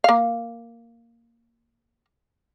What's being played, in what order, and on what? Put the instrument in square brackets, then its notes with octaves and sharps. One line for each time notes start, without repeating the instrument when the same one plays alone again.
[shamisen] A#3 F5